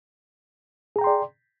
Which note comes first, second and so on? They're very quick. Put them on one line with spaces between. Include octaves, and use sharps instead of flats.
G#4 A#5 G5 C6 D5